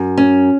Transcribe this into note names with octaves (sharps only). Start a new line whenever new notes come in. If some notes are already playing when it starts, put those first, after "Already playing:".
Already playing: F#2
C#4